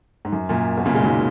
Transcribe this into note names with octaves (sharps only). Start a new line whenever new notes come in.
G#2
F#2
F#2 A#2
B2
A#2 C#3
G#3
D#3 F#3